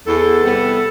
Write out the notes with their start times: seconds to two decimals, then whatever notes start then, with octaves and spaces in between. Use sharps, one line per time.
0.07 E2 A4
0.45 C3 G3 B3